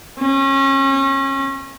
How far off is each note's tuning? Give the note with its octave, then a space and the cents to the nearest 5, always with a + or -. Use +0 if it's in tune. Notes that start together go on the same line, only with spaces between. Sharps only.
C#4 -30